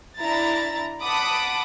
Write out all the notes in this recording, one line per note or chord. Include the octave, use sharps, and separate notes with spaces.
D4 E4 A#5 A6
F#5 A5 B5 D6 D#6